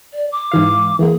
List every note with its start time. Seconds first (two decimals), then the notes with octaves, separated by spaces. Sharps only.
0.13 D5
0.32 D6
0.52 G#2 E3 F5
0.99 E3 A#3 G#4